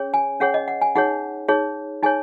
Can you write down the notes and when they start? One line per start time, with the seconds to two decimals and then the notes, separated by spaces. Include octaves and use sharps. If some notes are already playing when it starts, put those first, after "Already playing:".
Already playing: C#4 G#4 C#5
0.14 G#5
0.40 C#4 G#4 C#5 F#5
0.54 D#5
0.68 F#5
0.82 G#5
0.95 D#4 G#4 C#5 F#5
1.48 D#4 G#4 C#5
2.03 D#4 G#4 C#5 G#5